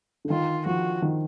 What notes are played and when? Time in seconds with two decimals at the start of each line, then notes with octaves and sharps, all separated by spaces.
0.25 D3
0.30 D#3 F4
0.66 F3 F#4
1.02 D#3